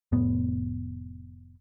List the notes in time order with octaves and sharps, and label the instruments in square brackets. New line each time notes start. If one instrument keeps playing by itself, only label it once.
[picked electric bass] F1 A2 B3